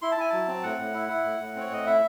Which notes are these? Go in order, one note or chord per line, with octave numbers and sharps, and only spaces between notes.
E4 C6
A5
E4 G#5
F#3 A5
C4
A2 F#5
A2
E4
E4
A2
A2
C4 C#5
A2 D#5
E4 E5